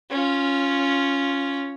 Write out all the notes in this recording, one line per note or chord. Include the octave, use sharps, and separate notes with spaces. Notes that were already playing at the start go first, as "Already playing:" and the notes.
C#4 F4